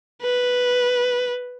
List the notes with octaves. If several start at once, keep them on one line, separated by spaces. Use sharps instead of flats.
B4